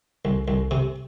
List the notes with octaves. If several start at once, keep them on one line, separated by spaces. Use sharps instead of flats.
C2
C2
C3